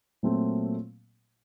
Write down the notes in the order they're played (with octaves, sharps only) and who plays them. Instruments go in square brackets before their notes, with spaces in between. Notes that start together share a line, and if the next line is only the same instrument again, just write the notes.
[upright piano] A#2 F#3 A3 C4